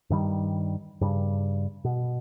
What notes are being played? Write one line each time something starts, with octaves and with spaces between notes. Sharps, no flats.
G2 D#3 G3
G2 C#3 G3
B2